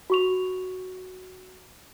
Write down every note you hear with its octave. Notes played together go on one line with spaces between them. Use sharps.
F#4 C#6 F7